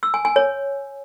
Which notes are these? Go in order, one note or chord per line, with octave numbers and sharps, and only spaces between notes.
E6
G#5
G#5
C#5